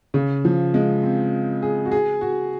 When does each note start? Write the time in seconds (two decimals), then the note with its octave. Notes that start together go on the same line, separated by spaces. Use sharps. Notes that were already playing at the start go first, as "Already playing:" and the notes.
0.14 C#3
0.45 F3
0.74 G#3
1.03 C4
1.62 G#4
1.85 F#4
1.92 G#4
2.21 F#4